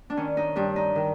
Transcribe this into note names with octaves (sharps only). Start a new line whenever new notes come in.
D4
D#3 C#4
D#4
G2 D4
D#4
D#3